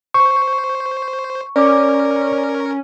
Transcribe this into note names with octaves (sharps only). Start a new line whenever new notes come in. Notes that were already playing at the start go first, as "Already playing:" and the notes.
C5 C#6
C#4 A#4 D5 D6